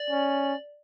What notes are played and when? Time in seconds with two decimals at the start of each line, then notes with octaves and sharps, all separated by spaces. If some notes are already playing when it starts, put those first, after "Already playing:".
Already playing: D5
0.10 C#4